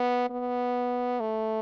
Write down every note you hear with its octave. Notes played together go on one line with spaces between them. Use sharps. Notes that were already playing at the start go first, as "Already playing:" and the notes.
Already playing: B3
B3
A3